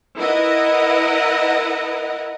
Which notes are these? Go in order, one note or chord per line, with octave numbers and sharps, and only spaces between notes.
E4 A#4 B4 D#5 F#5